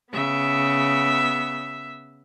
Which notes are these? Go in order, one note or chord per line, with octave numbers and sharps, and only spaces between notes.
C#3 B3 E5